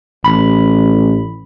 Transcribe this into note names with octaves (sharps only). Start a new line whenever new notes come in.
A1 B5